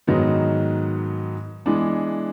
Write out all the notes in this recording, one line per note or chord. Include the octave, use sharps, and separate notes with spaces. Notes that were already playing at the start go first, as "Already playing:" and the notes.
G#2 D#3 F#3 B3 D#4
E3 G#3 B3 D4